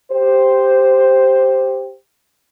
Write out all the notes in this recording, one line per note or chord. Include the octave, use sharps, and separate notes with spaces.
G4 C5